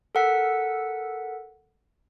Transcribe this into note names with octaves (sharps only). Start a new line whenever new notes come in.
A4 A#4 F#5 E6 B6